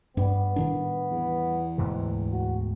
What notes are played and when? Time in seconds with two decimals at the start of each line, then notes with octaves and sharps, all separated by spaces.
0.17 G2 G3 B3
0.56 A2 D#3 D4
1.11 E2
1.78 D2 G#2 C3
2.31 F#4